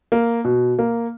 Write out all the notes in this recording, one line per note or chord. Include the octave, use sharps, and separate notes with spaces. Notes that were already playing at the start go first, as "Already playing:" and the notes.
A#3
B2
A#3